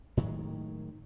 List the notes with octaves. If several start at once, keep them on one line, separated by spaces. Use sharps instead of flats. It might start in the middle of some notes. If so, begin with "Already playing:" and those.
A2 D#3 F#3 G#3